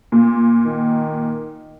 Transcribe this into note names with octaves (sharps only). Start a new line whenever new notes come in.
A#2
D#3